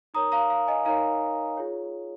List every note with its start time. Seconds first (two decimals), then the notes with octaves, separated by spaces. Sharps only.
0.14 D#4 A#4 C#5 A#5 D#6
0.32 F5 A#5
0.50 F5
0.67 D#5 G#5
0.85 D#4 A#4 C#5 F5 A#5
1.57 F4 G#4 C#5